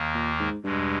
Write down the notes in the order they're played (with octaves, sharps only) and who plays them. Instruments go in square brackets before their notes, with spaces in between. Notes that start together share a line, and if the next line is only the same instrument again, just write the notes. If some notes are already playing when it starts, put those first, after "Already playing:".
Already playing: [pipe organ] D#2 D#3 A#3
[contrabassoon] A#2
G#2
[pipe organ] E2 B2 G#3 [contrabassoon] G2